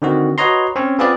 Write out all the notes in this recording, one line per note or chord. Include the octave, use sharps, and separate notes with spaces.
D3 D#3 C4 F#4
F#4 B4 C#5 D#5 A#5 C6
C4 C#4 C#5
B3 C4 F4 G#4 B4 D5